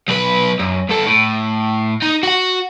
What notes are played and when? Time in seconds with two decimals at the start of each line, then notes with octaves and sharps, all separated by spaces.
0.08 B1 B4
0.60 F#2
0.89 G2 A4
1.06 A2
2.02 D#4
2.23 F#4 F#5